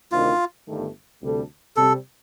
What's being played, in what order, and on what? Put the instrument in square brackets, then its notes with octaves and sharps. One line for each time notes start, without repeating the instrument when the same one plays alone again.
[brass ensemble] D2 C3 D#3 [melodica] F4
[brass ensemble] G1 G2 D#3 A3
D2 C3 G3 D4 A4
[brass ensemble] C3 G3 C4 [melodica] A4